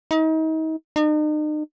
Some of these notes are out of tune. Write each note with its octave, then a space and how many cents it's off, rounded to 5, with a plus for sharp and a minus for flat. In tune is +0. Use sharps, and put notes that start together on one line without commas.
D#4 +35
D#4 -40